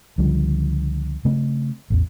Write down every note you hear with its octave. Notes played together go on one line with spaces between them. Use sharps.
C#2 D3 F3 G3
C#3 A3 C4
A1 E2